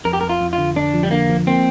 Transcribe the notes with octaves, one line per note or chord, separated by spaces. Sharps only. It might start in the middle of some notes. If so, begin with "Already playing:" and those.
F2 A#4
G4
F2 A#4
F4
F2
F4
D3
D3 D4
F3
G3
D3 A#3
F3
A#3 C4